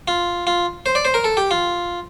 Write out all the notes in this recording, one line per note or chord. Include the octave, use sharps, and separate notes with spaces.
F4
F4
C5
D5
C5
A#4
A4
G4
F4